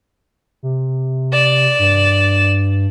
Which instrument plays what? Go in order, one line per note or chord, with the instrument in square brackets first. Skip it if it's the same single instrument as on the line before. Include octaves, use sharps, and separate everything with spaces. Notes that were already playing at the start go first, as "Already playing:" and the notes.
[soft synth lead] C3
[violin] D5 E7
[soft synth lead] G2